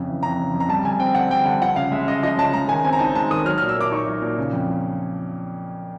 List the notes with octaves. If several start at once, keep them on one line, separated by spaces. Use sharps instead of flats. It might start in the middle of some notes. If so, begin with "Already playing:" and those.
Already playing: F2 C#3
E3
F2 A#5
C#3
F2
A#5
G3 A5
D3 G#5
C4 G5
D3 F#5
G3 G5
D3 F#5
F3 F#5
C#3 F5
G#3 E5
C#3 D#5
F3 D#5
C#3 A5
G#3 A#5
D#3 G#5
C4 G#5
A#5
D#4 A5
G#3 A5
D#3 D#6
F#3 F6
A#2 F6
E6
A#3 D6
D#4 C#6
F#3
A#2
C#3
F2
F3